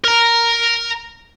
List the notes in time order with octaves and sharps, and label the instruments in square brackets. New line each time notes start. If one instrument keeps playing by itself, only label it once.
[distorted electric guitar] A#4 A#5